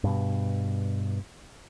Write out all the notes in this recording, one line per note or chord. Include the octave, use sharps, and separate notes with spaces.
G2 B2